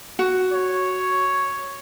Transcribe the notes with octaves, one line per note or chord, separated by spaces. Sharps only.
F#4
C#5